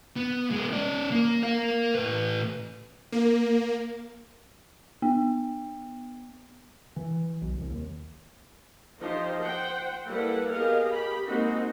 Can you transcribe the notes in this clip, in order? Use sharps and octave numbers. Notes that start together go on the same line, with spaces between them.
B3
G#3 B3
C#4 D5
A#3
A#4 F5
A2 B4
A#3
B3
E3
B1
C2
D#2
F3 D#4 G4 C5
C5 F#5 G5
G3 A#3 E4 A4 B4 F#5
B3 G4 G#4 A#4 D#5 F5
G4 B5
G#3 A#3 C4 D#4 F#4